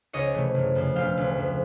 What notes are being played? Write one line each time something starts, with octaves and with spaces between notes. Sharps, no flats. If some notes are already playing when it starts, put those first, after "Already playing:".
C#2 C#5 D#5
C3 E3 A3
F#1
F2 C#3
E1 F5 G5
D2 C#3
F2